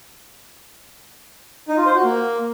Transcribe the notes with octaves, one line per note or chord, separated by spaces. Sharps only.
D#4
F4
C5
F#4
A#3